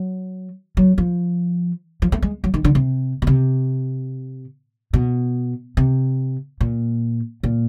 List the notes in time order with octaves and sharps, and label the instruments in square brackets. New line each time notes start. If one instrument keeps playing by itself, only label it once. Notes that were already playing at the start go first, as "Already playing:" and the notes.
Already playing: [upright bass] F#3
F#3
F3
F3
A3
G#3
F#3
D#3
D3
C3
B2
C3
B2
C3
A#2
A#2